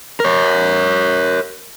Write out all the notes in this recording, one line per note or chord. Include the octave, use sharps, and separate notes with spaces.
A#4 C#5